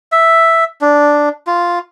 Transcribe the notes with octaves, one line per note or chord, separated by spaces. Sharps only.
E5
D4
F4